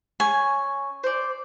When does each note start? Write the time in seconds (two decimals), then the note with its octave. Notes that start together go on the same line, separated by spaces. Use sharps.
0.20 C#4 G#5
1.04 C5 D5